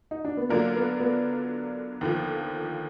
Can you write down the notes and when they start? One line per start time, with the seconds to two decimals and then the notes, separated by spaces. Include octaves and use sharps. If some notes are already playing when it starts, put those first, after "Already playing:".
0.11 D#4
0.25 D4
0.37 B3
0.49 D3 F#3 A#3 D4 F4 A#4
0.76 B3
1.00 B3
2.01 D#2 D3 F3